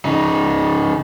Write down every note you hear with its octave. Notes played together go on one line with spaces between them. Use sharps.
C#3 D#4